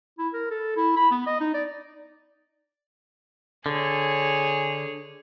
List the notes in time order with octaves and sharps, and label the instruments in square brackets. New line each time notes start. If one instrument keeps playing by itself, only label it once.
[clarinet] E4
A#4
A4
E4
B5
B3
D#5
D#4
D5
[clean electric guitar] D3 [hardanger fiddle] G#4 C#5